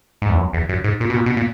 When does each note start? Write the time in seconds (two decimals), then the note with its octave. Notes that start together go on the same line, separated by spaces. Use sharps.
0.22 G#2
0.30 E2
0.37 F#2
0.53 E2
0.69 F#2
0.84 G#2
1.00 A#2
1.10 B2
1.16 A#2
1.26 B2
1.37 A#2